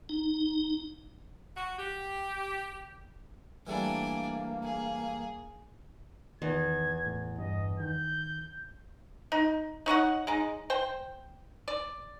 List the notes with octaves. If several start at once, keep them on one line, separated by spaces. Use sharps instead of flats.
D#4
F#4
G4
E3 G3 A3 A#3 D4 G#5
G#4
E2 D#3 G#6
A2
G2 D#5
D#3 G6
D#4
D#4 C#5 D#5 F#5
G#3 D#4
C5 G5
D5